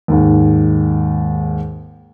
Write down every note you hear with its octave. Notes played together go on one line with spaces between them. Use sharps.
D#2 G#2